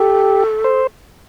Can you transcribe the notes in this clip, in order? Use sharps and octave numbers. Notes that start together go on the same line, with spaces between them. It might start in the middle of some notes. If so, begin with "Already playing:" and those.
Already playing: G4 A4
C5